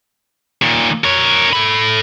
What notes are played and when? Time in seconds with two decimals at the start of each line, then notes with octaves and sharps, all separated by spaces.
0.62 A#2 D#3
1.04 A#4 C#5
1.53 A4 B5